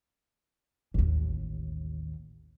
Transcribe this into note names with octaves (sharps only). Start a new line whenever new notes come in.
A1 D#2